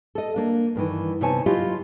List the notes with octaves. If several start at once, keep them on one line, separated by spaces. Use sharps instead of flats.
A4 D#5
A#3 D4
G2 D#3 E3
C3 B3 D#4 C#5 G#5 A5
F#3 E4 F4 G4 D#5 F5